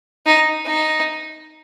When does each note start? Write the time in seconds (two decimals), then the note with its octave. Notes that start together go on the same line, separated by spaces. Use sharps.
0.26 D#4
0.66 D#4